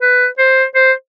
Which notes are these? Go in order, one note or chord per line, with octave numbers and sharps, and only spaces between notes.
B4
C5
C5